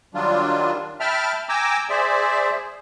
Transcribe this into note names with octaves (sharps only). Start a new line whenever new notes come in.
D#3 F#3 G3 D4 F4
E5 G5 A5 B5 F6
G5 G#5 A#5 D6 E6
G#4 C5 D5 E5